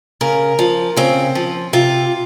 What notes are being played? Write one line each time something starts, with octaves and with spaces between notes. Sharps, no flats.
C#3 A#4
F3
C#3 C4
F3
C3 F4